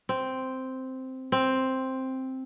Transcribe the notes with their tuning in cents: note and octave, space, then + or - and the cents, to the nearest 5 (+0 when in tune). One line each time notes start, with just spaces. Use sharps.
C4 -5
C4 +5